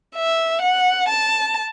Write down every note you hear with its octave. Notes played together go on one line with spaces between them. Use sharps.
E5
F#5
A5